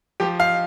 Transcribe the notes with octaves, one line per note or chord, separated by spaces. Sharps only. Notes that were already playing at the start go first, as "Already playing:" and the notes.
F3 G4
F5